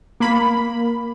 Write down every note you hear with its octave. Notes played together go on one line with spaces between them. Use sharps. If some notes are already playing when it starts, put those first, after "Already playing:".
A#3 B5